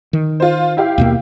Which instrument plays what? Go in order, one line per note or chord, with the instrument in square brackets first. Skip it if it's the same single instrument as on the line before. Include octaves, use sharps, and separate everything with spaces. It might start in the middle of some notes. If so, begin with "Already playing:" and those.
[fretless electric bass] D#3
[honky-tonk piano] F4 C5
E4 G4 F5
[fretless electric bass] D#2 B2 A#3